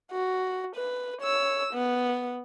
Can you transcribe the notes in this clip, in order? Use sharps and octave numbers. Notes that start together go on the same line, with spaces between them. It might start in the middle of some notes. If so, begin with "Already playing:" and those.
F#4
B4
C#5 E6
B3